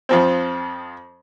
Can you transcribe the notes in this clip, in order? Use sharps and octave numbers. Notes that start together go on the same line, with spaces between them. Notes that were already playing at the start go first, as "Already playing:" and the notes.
F2 F3 C4